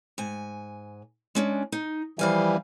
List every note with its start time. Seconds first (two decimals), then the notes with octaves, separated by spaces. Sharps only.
0.18 G#2 G#5
1.35 G#3 C#4 D4
1.72 D#4
2.19 E3 F3 G3 F5 G#5